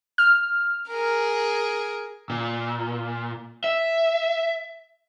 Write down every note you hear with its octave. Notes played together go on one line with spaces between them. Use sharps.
F6
G#4 A#4
A#2
E5